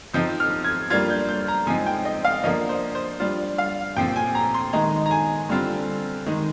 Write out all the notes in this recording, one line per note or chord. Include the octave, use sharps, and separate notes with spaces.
F3 C4 D#4 G6
F6
G#6
G3 A#3 D4 F4 G#6
G6
G6
A#5
F3 G#3 C4 D#4 G#5
G5
D#5
F5
F3 A#3 D4 D#5
C5
C5
G3 D4 F4
F5
A#2 F3 C4 G5
G#5
A#5
C6
D#3 G#3 D#4 A#5
A#5
G#5
D3 G3 C4 F4
D#3 G#3 D#4